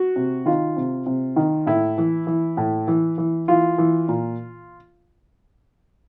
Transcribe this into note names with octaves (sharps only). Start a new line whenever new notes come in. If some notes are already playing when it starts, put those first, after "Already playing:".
Already playing: F#4
C3
D#3 F4
C3
C3
D#3
A2 E4
E3
E3
A2
E3
E3
E3 F4
E3
A#2